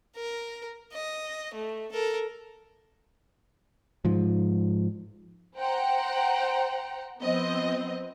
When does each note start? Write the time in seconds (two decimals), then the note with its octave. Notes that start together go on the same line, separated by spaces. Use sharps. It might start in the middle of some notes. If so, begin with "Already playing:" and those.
0.16 A#4
0.93 D#5
1.54 A3
1.92 A4 A#4
4.05 G#2 F3
5.57 C5 F#5 G5 A#5
7.21 F3 B3 C4 D#5